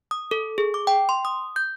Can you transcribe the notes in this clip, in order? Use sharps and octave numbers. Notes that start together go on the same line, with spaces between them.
D#6
A4
G#4
D6
G5
C6
D#6
G6